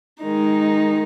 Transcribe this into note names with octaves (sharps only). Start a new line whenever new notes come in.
D#3 G#3 D#4